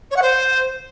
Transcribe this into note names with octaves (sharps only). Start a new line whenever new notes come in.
C#5
F#5
C5